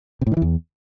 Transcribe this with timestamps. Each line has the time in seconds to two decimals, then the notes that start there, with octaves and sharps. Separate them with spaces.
0.21 C3
0.27 A2
0.32 D#3
0.37 E3
0.42 E2